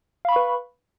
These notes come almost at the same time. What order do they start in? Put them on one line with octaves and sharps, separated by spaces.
F5 B5 C#6 B4